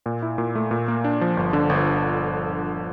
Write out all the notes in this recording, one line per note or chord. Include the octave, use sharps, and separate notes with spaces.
A#2
E4
A#2
A3
A#2
A#3
D4
F3
G1
D3
G1